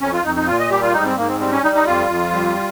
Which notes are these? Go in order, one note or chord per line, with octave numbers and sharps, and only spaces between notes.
F2 C#4
F4
F2 D#4
D#4
A#2 F4
D#5
G3 G4
F4
G#2 D#4
C4
G#2 A#3
C4
G3 C4
C#4
G3 D#4
D#4
F2 F4
F2
G3